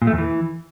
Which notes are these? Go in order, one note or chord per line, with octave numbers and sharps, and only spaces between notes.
A#2
A3
E2
E3